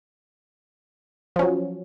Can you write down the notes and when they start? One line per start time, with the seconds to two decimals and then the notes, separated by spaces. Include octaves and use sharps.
1.36 F3
1.39 C#4
1.42 F#3